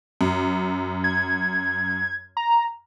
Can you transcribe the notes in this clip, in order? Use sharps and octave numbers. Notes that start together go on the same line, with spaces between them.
F#2
G#6
A#5